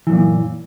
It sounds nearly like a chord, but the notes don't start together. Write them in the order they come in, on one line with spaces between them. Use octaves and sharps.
E3 F#2 A#2